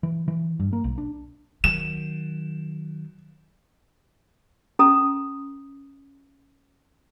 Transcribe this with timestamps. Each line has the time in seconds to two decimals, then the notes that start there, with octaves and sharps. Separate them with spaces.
0.03 E3
0.28 E3
0.60 G2
0.73 A#3
0.84 B1
0.98 D4
1.64 D#3 F#3 E7
4.79 C#4 A4 A#5 D#6